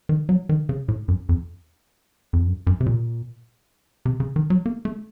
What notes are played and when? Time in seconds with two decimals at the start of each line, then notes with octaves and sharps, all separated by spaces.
0.09 D#3
0.29 F#3
0.49 D#3
0.69 C#3
0.88 A2
1.08 F#2
1.29 F2
2.33 F2
2.47 F#2
2.67 F#2
2.81 C3
2.86 A#2
4.06 C3
4.20 C#3
4.36 D#3
4.50 F#3
4.66 A#3
4.85 A3